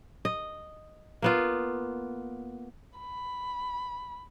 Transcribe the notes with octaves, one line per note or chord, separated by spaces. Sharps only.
D#5
A#3 B3 F4
B5